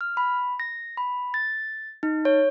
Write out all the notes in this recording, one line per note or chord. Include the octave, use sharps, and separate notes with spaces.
F6
B5
A#6
B5
A6
D#4
C#5